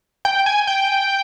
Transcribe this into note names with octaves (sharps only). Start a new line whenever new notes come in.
G5
G#5
G5